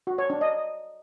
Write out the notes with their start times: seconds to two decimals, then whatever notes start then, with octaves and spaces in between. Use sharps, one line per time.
0.07 F#4
0.18 C#5
0.30 D4
0.41 D#5